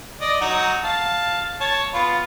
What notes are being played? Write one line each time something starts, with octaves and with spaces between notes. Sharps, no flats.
D5 D#5
F#3 D#4 F#4
F5 A5
C#5 A5
B3 F4